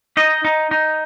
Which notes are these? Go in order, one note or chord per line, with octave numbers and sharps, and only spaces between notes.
D#4 D#5
D#4
D#4